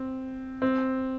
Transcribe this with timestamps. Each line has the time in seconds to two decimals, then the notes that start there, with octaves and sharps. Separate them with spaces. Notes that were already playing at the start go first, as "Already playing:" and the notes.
Already playing: C4
0.62 C4